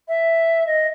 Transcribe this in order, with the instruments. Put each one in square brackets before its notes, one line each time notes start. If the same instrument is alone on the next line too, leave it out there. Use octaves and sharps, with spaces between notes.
[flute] E5
D#5